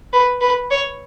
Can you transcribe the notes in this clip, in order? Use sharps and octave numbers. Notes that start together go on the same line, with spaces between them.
B4
B4
C#5